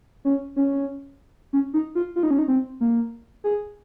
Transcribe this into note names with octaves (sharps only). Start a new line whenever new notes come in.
C#4
C#4
C#4
D#4
F4
F4
D#4
C#4
D#4
C4
A#3
G#4